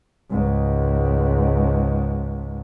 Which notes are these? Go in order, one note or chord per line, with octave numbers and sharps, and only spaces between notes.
C#2 G#2